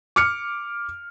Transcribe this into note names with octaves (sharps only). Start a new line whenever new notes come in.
D6 F6 C#7